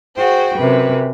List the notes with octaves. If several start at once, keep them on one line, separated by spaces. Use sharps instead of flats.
F#4 G#4 C5 G5
F#2 C3 B4